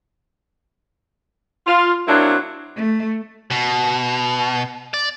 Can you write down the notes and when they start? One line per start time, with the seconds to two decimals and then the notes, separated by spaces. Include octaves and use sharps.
1.67 F4
2.08 F#3 A#3 C4 D4 E4
2.76 A3
3.51 B2
4.94 D5